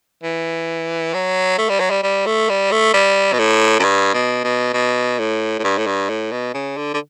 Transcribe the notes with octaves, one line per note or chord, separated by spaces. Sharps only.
E3
F#3
A3
G3
F#3
G3
G3
A3
G3
A3
G3
B2
A2
F#2
G2
B2
B2
B2
A2
A2
G2
A2
G2
A2
B2
C#3
D3
D3